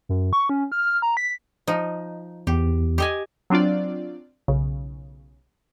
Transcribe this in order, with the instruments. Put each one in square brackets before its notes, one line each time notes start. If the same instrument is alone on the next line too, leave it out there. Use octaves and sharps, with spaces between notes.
[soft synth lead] F#2
C#6
C#4
F6
A#5
B6
[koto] F3 D#4
[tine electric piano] E2 [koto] G4
[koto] G4 D#5 G#5
[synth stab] F#3 C4 D4 F4 D5
B1 C#3